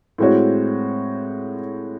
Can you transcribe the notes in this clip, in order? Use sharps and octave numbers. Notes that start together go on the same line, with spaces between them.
A2 G#3 C4 F#4 C#5